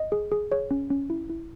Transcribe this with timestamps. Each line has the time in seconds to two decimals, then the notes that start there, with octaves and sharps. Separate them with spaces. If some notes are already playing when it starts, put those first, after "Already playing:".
Already playing: D#5
0.12 G#4
0.32 G#4
0.52 G#4 C#5
0.71 C#4
0.91 C#4
1.10 E4
1.29 E4